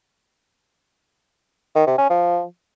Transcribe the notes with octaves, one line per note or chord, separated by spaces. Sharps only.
D#3
C3
C#4
F3